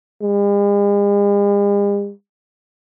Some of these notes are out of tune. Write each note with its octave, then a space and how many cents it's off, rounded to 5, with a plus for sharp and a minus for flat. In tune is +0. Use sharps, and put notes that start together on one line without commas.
G#3 -45